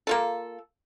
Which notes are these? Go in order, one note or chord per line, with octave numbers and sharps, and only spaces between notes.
A#3 F4 A4